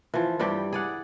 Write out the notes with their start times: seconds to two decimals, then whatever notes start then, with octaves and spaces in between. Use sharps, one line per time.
0.14 E3 F3
0.39 G2 E3 G3 G4
0.73 G#4 D5 F#5